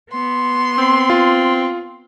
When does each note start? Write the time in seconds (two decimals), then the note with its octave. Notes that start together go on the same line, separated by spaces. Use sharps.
0.10 B3 C6
0.78 C4
1.10 F4